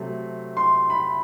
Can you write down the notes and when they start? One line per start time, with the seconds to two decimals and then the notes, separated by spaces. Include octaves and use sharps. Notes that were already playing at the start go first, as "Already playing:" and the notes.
Already playing: C3 F#3 A3
0.57 C6
0.90 B5